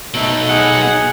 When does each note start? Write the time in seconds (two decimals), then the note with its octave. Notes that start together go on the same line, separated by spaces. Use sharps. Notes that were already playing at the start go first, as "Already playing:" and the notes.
0.14 B2 A3 D#4
0.49 G#4 F#5